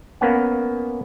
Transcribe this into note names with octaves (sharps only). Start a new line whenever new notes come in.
A#3 B3 C#4 F#5